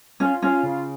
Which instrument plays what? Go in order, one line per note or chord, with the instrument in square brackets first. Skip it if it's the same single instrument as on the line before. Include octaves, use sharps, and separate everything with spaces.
[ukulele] C#4 [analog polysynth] F4
[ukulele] C#4 [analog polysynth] F4
[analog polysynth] C#3